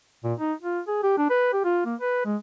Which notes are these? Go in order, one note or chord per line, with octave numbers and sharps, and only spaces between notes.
A#2
D#4
F4
G#4
G4
D4
B4
G4
F4
A#3
B4
G#3